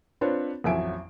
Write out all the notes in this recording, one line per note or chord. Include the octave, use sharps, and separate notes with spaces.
C4 D4 F4 B4 C#5
A1 F2 F#3 E5 G#5 D7